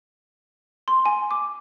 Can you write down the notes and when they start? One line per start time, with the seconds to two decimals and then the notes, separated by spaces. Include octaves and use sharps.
0.88 C6
1.06 G#5
1.31 D6